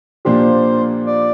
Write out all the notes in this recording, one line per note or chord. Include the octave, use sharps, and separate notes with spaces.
A#2 F3 A#3 D4 G4 C5
D5